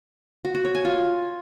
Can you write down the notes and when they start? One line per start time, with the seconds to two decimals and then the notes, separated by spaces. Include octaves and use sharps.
0.45 F#4
0.55 F#4
0.65 C#5
0.75 G#5
0.85 F4